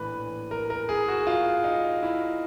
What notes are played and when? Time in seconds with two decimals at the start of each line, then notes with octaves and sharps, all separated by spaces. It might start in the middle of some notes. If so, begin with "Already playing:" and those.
Already playing: A#1 A2 E3 B4
0.51 A#4
0.70 A#4
0.89 G#4
1.08 F#4
1.27 F4
1.64 D#4
2.03 E4